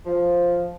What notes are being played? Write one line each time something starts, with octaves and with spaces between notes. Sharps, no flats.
F3